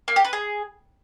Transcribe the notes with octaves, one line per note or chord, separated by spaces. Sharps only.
A#3
G4
B4
G#4